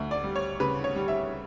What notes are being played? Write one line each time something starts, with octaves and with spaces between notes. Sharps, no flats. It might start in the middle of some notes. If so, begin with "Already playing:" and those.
Already playing: D2 E5
D5
G3
C#5
C#3 B4
C#5
G3
E5